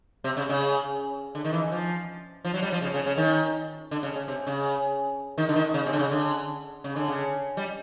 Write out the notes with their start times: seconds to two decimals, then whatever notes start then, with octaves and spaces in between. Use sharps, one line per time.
0.24 C3
0.37 C#3
0.49 C#3
1.35 D3
1.44 D#3
1.53 E3
1.72 F3
2.45 F3
2.54 F#3
2.62 G3
2.72 F3
2.82 C#3
2.94 C#3
3.06 C#3
3.17 D#3
3.91 D3
4.03 C#3
4.16 C#3
4.28 C3
4.47 C#3
5.38 D#3
5.49 D3
5.56 D#3
5.74 C#3
5.86 C3
5.93 D3
5.99 C#3
6.11 D3
6.84 C#3
6.96 D3
7.08 C#3
7.57 G3